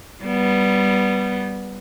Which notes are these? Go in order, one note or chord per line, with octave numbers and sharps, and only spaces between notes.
G3 B3